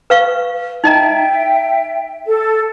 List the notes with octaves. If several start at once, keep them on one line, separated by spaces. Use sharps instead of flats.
B4 F5 C#6
D#4 D#5 E5 G5 A#5
A4